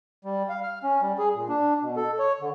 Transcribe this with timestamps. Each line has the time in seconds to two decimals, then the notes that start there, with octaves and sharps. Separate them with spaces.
0.25 G3
0.49 F5
0.63 F6
0.83 C#4
1.02 G3
1.19 G#4
1.35 A#2
1.49 D4
1.82 B2
1.97 A4
2.19 C#5
2.41 D3